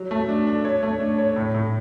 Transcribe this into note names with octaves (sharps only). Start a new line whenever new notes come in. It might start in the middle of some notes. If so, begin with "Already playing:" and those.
Already playing: F#3
A3
D4
D4
C#5
A3
D4
C#5
A2
A2